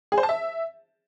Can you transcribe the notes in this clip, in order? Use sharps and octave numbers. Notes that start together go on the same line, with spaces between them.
G#4
C5
A5
E5